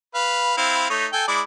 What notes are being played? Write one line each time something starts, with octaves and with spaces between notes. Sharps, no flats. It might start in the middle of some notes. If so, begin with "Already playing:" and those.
B4 F5
C4 E4 F5
A3 D#4 C#5
A4 G5 G#5
G#3 E4 D5